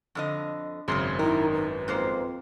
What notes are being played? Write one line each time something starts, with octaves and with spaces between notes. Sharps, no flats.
F2 D3 D#5
G#1 F#2 C#3 C4 G#4 C6
D#3 E4 A#4
B4
F2 G#2 A#3 C5